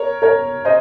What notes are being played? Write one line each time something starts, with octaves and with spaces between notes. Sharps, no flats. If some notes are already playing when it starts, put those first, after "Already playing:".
Already playing: A#4 C#5
A#4 C#5
C5 D#5